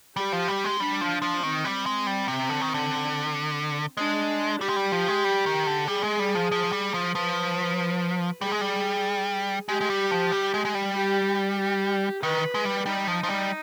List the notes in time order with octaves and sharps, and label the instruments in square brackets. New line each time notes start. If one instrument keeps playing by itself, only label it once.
[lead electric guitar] G3 [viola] G4
[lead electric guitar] F3
G3
G#3
[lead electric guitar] G3 [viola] D4
[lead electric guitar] F3
F3
[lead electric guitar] D#3 [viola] C4
[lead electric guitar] G3
G#3
G3
C3
D3
D#3
D3
[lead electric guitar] G#3 [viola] D4
[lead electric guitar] G3 [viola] G4
[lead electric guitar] G#3
G3
F3
G#3
G3
D#3
D3
[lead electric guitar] G3 [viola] G#4
[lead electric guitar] G#3
G3
F3
F3
G3
F3
[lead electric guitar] F3 [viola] B4
[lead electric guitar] G3 [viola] G#4
[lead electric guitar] G#3
G3
[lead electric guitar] G#3 [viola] G4
[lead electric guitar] G#3
G3
F3
G3
G#3
G#3
G3
[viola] G4
G4
[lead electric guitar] D#3 [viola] B4
[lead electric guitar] G#3
G3
[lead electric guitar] G3 [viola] D#4
[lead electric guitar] F3
F3
G3